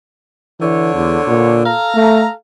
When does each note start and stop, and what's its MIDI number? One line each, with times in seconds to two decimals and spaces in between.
0.61 1.60 50
0.61 0.91 52
0.61 1.60 73
0.94 1.18 40
1.27 1.73 46
1.65 2.33 69
1.65 2.33 77
1.65 2.33 82
1.95 2.25 57